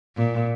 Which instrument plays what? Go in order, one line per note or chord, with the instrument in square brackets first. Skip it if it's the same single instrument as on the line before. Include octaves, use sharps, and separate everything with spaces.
[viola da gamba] A#2